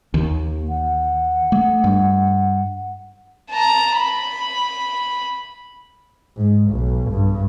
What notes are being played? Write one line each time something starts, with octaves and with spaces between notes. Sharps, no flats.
D#2 A#3
F#5
A3
G2
A5 A#5
B5
G#2
B1
G2